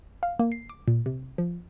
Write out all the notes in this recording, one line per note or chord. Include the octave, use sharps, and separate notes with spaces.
F5
A#3
C7
D6
A#2
C3
F3